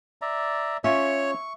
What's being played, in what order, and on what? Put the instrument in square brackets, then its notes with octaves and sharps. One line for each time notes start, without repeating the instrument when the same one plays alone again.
[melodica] D5 E5 A#5
[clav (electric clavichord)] C#4 F4 [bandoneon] C#5 [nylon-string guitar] E5 [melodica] C#6